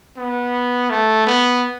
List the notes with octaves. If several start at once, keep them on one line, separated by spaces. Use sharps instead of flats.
B3
A3
B3